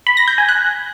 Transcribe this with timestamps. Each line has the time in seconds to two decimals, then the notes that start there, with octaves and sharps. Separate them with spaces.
0.07 B5
0.17 A#6
0.28 G6
0.38 G#5
0.49 F#6